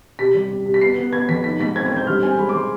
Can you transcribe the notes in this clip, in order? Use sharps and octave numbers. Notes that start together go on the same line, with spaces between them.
C3 B6
G3
C3
C3
B6
B3 C7
B3
B3 G#6
F2 B6
D#4 B6
G#2 B6
C4 G#6
G#6
C4
G6
G2 F6
C4 G#5
G#3 B5
D6
G#3 C6